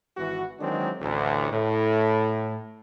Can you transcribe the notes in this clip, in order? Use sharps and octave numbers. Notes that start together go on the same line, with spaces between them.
G#1 E3 F#4
D#3 E3 F#3 G#3 C4 D4
A1 D2
A2